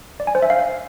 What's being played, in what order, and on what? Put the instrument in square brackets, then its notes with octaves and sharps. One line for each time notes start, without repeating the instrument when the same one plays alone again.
[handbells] D5
G#5
C5
E5
F5